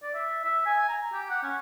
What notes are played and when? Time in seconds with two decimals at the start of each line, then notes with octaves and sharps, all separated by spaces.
0.02 D5
0.14 E5
0.44 E5
0.65 G#5
0.88 A#5
1.13 G4
1.30 F#5
1.43 C#4